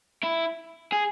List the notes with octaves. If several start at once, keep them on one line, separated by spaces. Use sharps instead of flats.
E4
G#4